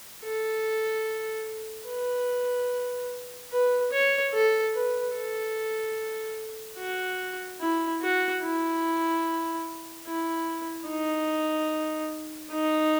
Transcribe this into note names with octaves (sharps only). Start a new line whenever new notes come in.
A4
B4
B4
C#5
A4
B4
A4
F#4
E4
F#4
E4
E4
D#4
D#4